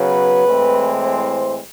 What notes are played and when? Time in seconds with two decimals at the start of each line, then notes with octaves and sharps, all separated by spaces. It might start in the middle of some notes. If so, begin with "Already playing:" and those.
Already playing: C#3 F#3 B3 B4
0.47 A2 E3 G#3 C4
1.04 C5